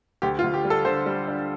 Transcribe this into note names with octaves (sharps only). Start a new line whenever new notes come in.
D2 G4
F4
D2
G4
G3
A4
D3 C5
G3
D4